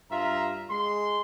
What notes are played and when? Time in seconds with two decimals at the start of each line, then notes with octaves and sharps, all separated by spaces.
0.11 G2 F4 E5 A#5
0.69 G#3 C6